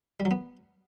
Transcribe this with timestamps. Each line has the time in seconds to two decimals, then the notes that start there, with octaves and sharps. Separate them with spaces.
0.20 G3
0.25 F#3
0.31 B3